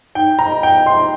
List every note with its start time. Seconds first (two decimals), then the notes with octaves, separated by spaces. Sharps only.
0.15 D#4 G5
0.39 A#5
0.47 D#5
0.63 G5
0.78 D#5
0.86 C6